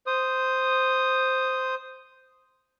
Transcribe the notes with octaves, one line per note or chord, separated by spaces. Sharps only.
C5 D#6